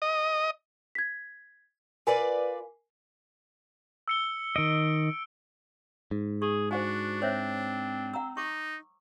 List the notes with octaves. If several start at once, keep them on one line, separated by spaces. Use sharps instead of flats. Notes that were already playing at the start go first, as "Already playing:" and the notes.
D#5
G#6 B6
F4 A#4 B4 D5 G#5
E6 C#7 G7
D#3 D#5 D7
G#2
G#4 C#6
D4 F#4 C5 F#5 G#5
C4 C5 C#5 E5
F#5 A#5 E6
D#4 C#6 D6